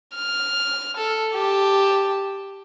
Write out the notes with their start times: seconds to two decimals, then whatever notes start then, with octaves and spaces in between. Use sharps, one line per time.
0.15 F6
0.97 A4
1.34 G4 A5